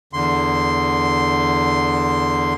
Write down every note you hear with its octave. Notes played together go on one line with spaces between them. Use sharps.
E2 D3 C6